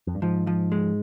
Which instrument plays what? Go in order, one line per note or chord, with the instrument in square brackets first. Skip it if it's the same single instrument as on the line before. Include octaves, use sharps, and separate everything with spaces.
[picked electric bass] F2
G2
[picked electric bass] G#2 [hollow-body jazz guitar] F3
[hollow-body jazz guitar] F3
G#3